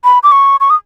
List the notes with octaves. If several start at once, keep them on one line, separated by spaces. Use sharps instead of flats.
B5
D6
C#6
C#6
D#6